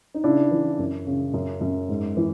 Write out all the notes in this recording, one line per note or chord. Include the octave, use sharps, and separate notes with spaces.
D#4
C#3 D4 E4
E3
F#2
C#3
F#2
F#2
G#2
E3